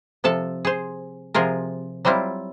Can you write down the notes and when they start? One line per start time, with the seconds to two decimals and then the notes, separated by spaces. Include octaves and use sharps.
0.24 C3 F3 A4 A5
0.65 G#4 C5
1.34 C3 F3 F4 G#4 A#4
2.05 F#3 G3 C4 E4 F4